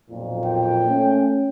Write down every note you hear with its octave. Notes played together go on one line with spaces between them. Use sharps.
B1 F2 A#2
G5
A3 C#4